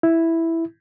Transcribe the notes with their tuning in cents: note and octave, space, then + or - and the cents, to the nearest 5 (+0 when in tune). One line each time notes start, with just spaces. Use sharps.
E4 +0